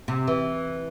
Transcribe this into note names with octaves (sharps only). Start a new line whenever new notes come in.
C3
E3